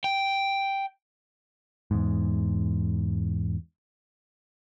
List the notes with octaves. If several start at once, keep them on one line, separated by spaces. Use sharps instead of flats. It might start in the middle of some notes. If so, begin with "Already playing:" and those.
G5
E2 G#2